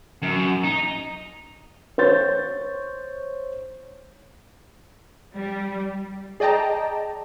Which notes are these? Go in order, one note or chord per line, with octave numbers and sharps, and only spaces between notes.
F#2
D#4
C5 C#5 G6 A6
G3
G#4 D5 D#5 G5 A5 A#5